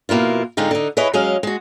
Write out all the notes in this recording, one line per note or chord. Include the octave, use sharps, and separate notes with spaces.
F2 B2 A#3 E4 F4
G#2 D3 G#3 C4 D#4 F4
D3 D#4
E4 G#4 B4 C#5 D#5
F#3 G#3 C#4 G#4 D#5 F5
G#3 F#4